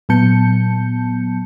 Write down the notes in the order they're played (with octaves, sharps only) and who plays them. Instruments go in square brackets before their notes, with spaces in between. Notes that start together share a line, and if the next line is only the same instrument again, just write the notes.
[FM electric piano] A#2 F#3 B3 A5 G6 C#7